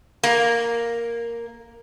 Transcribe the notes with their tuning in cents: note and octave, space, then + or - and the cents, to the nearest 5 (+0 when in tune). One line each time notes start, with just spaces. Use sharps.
A#3 +0